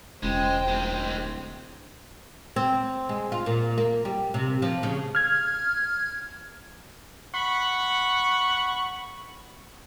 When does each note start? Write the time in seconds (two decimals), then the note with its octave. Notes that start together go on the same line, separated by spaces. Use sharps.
0.23 E1 C#2 G#3 C5 G5
0.68 D1 G#3 C4
2.56 C4
3.09 G#3
3.32 F4
3.46 A#2
3.78 A#3
4.05 G3
4.34 C3
4.62 F3
4.83 C#3
5.15 F6 G#6
7.34 F#5 B5 C#6